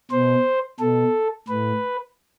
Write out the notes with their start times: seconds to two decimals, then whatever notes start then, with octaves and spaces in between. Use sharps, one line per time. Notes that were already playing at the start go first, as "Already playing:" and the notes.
0.11 B2 C5
0.79 B2 A4
1.48 A2 B4